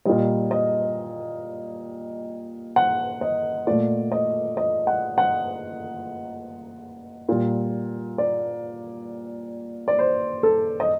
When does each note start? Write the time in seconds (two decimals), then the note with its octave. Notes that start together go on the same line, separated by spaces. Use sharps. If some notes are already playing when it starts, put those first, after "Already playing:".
0.05 A#2 G3 D#5
0.51 D#5
2.76 F#5
3.21 D#5
3.67 A#2 A3 D5
4.12 D#5
4.57 D#5
4.87 F#5
5.18 F#5
7.29 A#2 G3
8.18 D5
9.88 D5
9.99 C5
10.43 A4
10.80 D#5